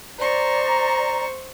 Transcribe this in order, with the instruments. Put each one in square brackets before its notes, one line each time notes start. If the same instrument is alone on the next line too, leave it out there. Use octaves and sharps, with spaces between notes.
[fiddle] C5 C#6 [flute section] D5 A#5